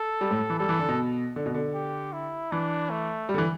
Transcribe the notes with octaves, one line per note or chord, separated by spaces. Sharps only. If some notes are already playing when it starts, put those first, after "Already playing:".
Already playing: A4
G3
A2
E3
G3 A4
E3
D3
B2
D3
B2
D3
G4
E4
E3 D4
A3
G3
D3
E3